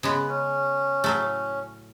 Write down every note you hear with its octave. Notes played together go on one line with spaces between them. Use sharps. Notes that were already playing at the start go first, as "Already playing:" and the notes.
C#3 G#3 B3 B4
C#4
A2 F#3 A3